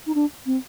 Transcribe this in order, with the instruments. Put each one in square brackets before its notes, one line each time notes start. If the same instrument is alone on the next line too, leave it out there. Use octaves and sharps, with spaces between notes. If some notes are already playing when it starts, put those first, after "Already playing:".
[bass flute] D#4
D4
C4